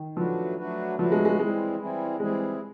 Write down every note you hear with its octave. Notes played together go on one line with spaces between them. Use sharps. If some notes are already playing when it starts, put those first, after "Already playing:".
Already playing: D#3
F3 F#3 A3 D4 F#4 B4
F#3 A3 D4 F#4 B4
F3 F#3 A3 D4 F#4 B4
G#3
G#3
E3 G3 G#3 C4 E4 G#4
E3 G3 C4 E4 G#4
E3 G3 G#3 C4 E4 G#4